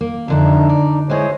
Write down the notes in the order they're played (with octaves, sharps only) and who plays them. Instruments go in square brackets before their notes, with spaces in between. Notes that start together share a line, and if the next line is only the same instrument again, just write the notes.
[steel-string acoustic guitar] A#3
[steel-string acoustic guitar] F2 D3 E5 [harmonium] D4 D#4
[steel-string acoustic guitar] D5
[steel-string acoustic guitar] G#3 E4 G#4 [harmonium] C5 C#5 D#5